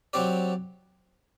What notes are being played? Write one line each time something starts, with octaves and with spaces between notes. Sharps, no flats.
F#3 C4 G4 D5